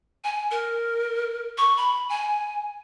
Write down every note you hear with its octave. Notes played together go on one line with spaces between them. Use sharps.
G#5
A#4
C#6
B5
G#5